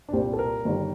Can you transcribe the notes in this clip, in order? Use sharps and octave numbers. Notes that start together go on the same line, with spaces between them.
D4
C2 A#2 G3 C4
A4
A#4
G1 G2 D#3 G3